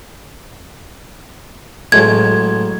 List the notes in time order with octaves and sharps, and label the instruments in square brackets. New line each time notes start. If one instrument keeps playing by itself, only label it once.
[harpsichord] A1 [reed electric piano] F#3 G#3 A3 [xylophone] G#6